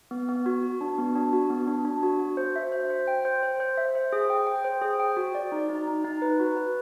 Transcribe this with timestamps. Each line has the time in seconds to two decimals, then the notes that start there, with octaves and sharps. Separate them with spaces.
0.11 B3
0.29 B3
0.46 F#4
0.63 F#4
0.81 D4
0.98 B3
1.15 D4
1.33 F#4
1.50 B3
1.67 D4
1.85 D4
2.03 F#4
2.20 F#4
2.37 C5
2.56 E5
2.72 C5
2.90 C5
3.08 G5
3.25 C5
3.43 C5
3.60 C5
3.78 E5
3.95 C5
4.13 G#4
4.30 G5
4.47 G5
4.65 C5
4.82 G#4
5.00 G5
5.17 F#4
5.35 D5
5.52 D#4
5.70 D#4
5.87 D#4
6.04 D#4
6.22 B4
6.40 F#4
6.57 B4